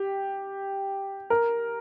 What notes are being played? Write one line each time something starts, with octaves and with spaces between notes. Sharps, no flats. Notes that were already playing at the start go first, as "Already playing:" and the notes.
Already playing: G4
A#4